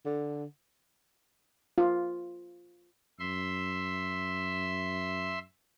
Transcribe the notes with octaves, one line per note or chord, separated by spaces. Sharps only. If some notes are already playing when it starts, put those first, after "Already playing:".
D3
F4
F#2 E5 C6